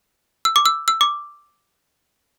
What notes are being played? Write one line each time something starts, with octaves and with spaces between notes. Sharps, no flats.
E6
D6
E6
E6
D6